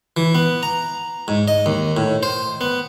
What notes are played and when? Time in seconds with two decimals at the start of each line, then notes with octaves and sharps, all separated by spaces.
0.17 E3
0.35 B3
0.63 A#5
1.28 G#2
1.48 D#5
1.66 D#2
1.97 A2
2.23 C5
2.61 B3